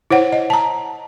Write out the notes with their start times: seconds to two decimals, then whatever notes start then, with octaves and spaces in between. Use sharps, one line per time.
0.10 E4 C5 C#5 F#5
0.32 D#5
0.50 A5 A#5